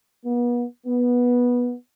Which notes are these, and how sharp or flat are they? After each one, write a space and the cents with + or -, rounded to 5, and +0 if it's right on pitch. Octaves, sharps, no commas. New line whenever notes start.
B3 -35
B3 -15